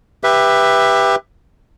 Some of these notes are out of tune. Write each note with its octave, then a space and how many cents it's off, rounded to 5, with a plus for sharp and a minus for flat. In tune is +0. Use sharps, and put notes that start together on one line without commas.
G4 +15 B4 +0 E5 +5